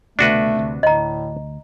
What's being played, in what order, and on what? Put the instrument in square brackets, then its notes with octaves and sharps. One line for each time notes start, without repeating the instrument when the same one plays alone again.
[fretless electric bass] C2 B2 D3 [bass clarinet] A3 [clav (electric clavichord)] D4 F#4 B4
[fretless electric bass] D2 C3
[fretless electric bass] D2 [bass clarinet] A2 [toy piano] D#5 A#5